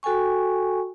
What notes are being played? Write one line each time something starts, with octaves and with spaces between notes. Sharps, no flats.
F#4 A4 G5 G#5 C#6